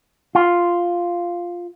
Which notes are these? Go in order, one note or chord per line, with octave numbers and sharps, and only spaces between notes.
F4